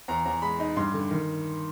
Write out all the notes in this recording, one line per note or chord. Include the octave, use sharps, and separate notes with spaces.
E2 A#5
E2 A#5
G#3 B5
D#4
G2 C6
D3
D#3